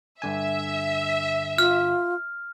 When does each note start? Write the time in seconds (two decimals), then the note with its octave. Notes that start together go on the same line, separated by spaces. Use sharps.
0.22 G2 D3 E5 G#5
1.58 F4 F6